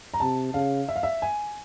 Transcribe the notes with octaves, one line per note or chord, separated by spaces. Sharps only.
A#5
C3 A5
C#3 F5
E5
F5
E5
G#5